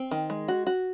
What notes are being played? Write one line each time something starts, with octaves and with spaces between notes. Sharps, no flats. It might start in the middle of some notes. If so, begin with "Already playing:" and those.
Already playing: C4
D#3
G#3
F#4
F#4